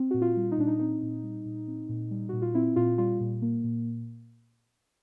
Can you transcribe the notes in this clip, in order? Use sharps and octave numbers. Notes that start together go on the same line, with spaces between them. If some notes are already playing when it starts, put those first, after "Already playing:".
Already playing: C4
A#2 F#4
F4
G3
D#4
A#2 D4
D#4
C4 D#4
A#2
G3
A#2
C4
A#2
G3
A#2 F#4
F4
C4 E4
A#2 F4
G3 F4
A#2
A#3
A#2